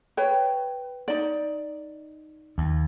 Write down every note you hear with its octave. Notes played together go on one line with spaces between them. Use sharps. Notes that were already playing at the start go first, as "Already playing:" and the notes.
B4 C#5 G5
D#4 D5
D#2